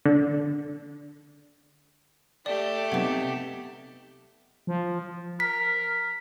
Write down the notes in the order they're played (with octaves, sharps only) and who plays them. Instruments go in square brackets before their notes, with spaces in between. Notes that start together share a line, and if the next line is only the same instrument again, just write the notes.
[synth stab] D3
[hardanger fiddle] A3 G4 [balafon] D5
[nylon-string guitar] C3 B3 D#4 [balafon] F#5 D6
[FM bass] F3
[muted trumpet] A#4 [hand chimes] B6